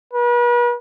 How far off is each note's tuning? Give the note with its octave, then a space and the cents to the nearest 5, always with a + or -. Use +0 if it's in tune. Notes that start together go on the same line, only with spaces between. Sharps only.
B4 -40